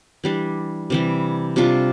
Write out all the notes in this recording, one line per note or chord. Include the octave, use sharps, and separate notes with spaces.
E3 G3 D4
C3 E3 G3
C3 G3 D4 F4